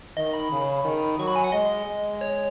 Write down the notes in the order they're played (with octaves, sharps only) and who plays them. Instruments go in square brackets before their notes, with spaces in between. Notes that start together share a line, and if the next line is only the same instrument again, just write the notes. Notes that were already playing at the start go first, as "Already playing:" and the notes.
[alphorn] D#3 [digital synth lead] D#5
[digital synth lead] B5
[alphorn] C#3
D#3
[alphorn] F#3 [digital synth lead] C#6
[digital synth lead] B5
G#5
F#5
[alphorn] G#3 [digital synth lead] D#5
[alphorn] G#3
[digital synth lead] C#5